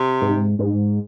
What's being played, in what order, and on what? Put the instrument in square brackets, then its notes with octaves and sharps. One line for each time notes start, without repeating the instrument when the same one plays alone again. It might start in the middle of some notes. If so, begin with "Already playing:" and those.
Already playing: [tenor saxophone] C3
[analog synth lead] G#2
G#2